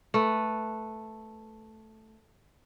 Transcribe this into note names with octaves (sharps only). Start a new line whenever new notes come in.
A3 B4